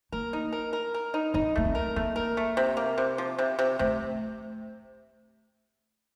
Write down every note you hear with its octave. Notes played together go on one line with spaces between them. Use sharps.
A#3 A#4
D#4
A#4
A#4
A#4
D#4
C4 D#4
A3 A#3
C4
A#4
A3 A#3
A#4
A3
C3
A#3
C3
F3
C3
C3
C3 A3